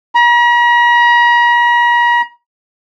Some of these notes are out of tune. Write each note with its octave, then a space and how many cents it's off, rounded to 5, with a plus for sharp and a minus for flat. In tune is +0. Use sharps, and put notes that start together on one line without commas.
A#5 +45